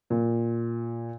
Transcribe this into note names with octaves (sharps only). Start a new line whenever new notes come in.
A#2